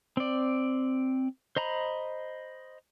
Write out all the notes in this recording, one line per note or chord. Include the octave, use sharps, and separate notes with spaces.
C4 D5
C5 D#5 A#5 B5